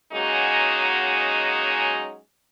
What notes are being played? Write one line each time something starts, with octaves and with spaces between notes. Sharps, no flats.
F#3 G#3 A#3 C#4 D#4 F#4